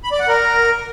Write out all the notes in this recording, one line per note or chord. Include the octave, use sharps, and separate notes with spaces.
B5
D5
F#5
A#4